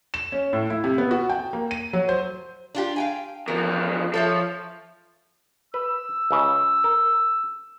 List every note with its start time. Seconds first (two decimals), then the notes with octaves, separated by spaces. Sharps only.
0.14 E7
0.32 C#4
0.53 A2
0.70 E4
0.84 C3
0.98 B3
1.11 F#4
1.29 G5
1.53 A#3
1.71 D#7
1.93 F#3
2.09 C5
2.75 D4 F4 G4
2.96 F5 G5 G#5
3.48 E2 F3 A#4
4.14 F3 A4 C#5 E5
5.74 B4 E6
6.31 C#2 C#3
6.84 A#4